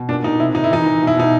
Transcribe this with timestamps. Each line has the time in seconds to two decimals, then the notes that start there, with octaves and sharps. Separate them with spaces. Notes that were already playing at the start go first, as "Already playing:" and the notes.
Already playing: B2
0.09 A#2 D4
0.24 A#2 D#4
0.40 C3 E4
0.55 D#3 D#4
0.64 E4
0.71 E3 D#4
0.86 E3
1.02 B2
1.07 E4
1.17 B2 D#4